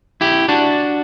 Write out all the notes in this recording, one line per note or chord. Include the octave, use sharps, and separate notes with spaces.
E4 G4
D4 F#4